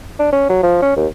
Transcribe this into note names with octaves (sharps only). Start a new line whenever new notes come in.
D4
C#4
F#3
F3
C#4
D#2